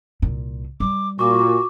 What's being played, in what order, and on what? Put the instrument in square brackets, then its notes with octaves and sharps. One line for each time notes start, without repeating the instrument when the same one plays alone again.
[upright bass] C2 A#2
[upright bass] G3 [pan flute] D6
[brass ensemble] A#2 [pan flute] F#4 [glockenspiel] C#6 D6